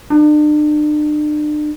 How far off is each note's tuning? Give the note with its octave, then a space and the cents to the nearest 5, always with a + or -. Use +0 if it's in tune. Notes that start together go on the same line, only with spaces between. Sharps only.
D4 +40